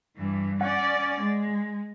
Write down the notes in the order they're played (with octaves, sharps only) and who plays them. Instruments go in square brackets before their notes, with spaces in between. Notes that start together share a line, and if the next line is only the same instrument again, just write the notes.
[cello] G2 E3
[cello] C#4 D5 [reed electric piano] F#5
[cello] G#3